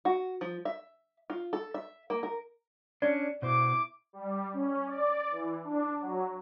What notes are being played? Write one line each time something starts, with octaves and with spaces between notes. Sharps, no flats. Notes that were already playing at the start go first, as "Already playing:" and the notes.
F#4
F3
E5
F4
A4
E5
A#3
A#4
C#4 D4 D5
B2 E4 C5 D6
G3
C#4
D5
E3
D4
F#3